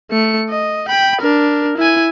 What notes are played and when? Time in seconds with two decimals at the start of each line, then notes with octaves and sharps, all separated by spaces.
0.11 A3 C#7
0.49 D#5
0.88 G5 B5
1.21 D4 A#4
1.77 E4 G#5